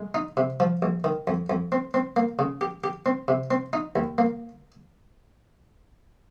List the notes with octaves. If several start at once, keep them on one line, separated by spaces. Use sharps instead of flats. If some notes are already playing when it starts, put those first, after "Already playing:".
Already playing: G#3
D#4
C3
F3
A#1
D#3
F2
F2
C4
C4
A#3
C#3
G4
G4
C4
C3
C4
D#4
D#2
A#3